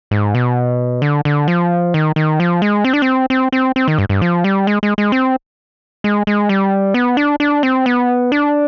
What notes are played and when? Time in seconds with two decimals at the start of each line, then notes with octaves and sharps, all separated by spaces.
0.11 G#2
0.34 B2
1.02 D3
1.25 D3
1.48 F3
1.94 D#3
2.16 D#3
2.40 F3
2.62 G#3
2.84 C4
2.93 D4
3.02 C4
3.30 C4
3.52 C4
3.76 C4
3.88 D#3
3.98 G2
4.09 G2
4.22 F3
4.44 G3
4.67 G#3
4.83 G#3
4.98 G#3
5.12 C4
6.04 G#3
6.27 G#3
6.49 G3
6.94 B3
7.17 D4
7.40 D4
7.63 C4
7.86 B3
8.32 D4